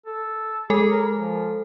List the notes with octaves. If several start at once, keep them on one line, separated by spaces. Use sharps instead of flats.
A4
G#3 G#4 A4 G#5
A#4
F3